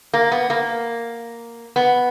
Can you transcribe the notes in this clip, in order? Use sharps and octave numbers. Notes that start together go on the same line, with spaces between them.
A#3
B3
A#3
B3